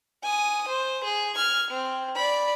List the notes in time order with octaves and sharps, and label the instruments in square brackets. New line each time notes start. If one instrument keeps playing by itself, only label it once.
[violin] G#5 D#6
C5
G#4
F6 G#6
C4
D5 B5